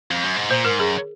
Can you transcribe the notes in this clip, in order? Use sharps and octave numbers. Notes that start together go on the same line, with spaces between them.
F2
F#2
G#2
A#2 C5
G#2 A#4
F#2 G#4